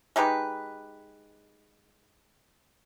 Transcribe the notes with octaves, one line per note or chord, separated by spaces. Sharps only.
G#3 D#4 G4 B4